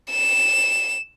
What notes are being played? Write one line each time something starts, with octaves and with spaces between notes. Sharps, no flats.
E7